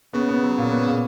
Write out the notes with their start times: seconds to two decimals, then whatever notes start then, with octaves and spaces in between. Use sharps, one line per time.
0.13 C#3 B3
0.29 B3
0.43 F#3
0.58 A#2
0.72 B3
0.86 A#2